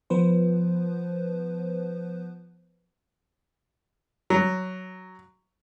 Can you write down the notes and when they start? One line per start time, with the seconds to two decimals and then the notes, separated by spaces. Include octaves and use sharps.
0.10 F3 B3 B4 C5
4.30 F#3